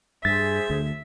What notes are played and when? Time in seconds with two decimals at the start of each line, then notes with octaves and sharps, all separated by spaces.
0.25 G2 G#4 C5 E5 A6
0.70 D2 D3